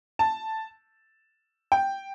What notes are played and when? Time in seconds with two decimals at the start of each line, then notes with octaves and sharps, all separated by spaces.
0.19 A5
1.72 G5